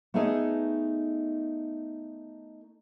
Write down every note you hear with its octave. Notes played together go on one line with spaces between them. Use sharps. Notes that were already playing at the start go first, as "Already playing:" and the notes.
A3 B3 D#4 G#4 A4 D#5